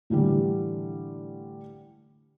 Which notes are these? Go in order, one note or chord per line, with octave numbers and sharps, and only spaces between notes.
A2 D3 E3 G3